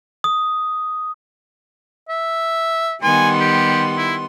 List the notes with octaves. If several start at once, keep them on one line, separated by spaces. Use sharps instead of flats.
D#6
E5
D#3 G3 B3 G#5 C6
G4
E4